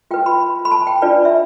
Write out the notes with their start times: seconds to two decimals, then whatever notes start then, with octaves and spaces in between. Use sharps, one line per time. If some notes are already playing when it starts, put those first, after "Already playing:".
0.11 F4 B4 G5
0.26 B5
0.40 B5
0.65 B5
0.71 A5
0.87 G5
1.02 D4 F4 B4 D5
1.25 E5